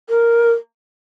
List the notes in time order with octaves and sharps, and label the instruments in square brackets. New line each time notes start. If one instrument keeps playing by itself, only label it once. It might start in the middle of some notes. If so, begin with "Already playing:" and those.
[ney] A#4